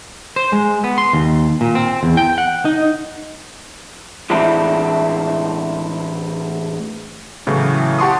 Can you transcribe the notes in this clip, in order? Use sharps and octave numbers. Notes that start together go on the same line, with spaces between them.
C5
G#3
B3
C6
D#2
A#2
C4
E2
G5
F#5
D#4
A2 E3 G#3 C4 D4 E4
A2 C#3 E3 F#3 A3
G4 F#5 A5 C6 C#6 D#6